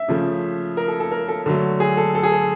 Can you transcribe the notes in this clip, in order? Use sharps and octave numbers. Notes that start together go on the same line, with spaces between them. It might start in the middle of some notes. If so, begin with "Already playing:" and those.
Already playing: E5
C#3 F3 A3
A#4
A4
A4
A#4
A4
D3 F#3 A3
G#4
A4
A4
G#4
A4